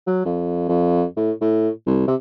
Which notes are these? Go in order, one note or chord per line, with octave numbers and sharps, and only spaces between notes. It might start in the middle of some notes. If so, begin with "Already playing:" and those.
F#3
F2
F2
A2
A2
C2
C3